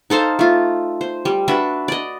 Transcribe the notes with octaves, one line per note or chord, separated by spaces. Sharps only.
D#4 A4 C5 F5
A3 F4
C5
G3
D4 F#4 B4 E5
D5 D#5